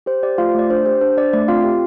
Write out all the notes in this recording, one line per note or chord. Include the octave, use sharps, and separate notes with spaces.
G4 C5
G4 D5
A3 F4 F5
C5
A3 D5
D4 C5
G4 C5
D4 C5
D4 D5
A3 D5
C4 F4 F5
G4